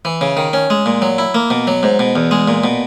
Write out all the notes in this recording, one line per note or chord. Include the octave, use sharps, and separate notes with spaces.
E3
C#3
D#3
C#4
G#3
A#2
F#3
E4
A#3
B2
F#3
G#2
B2
E2
G#3
A#2
B2